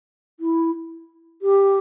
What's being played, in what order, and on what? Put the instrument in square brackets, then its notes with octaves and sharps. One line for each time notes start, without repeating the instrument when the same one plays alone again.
[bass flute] E4
G4